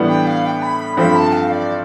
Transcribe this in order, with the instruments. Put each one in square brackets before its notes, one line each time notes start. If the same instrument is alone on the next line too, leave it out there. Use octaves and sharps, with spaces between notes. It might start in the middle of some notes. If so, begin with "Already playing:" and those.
Already playing: [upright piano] A2 E3 G3 B3 D4
[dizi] G5
F5
G5
B5
B5
[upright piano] G2 F3 A3 C4 [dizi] B5
[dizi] A5
F5
D5